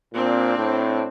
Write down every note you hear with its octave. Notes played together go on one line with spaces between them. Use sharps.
A#2 C4 D4
A2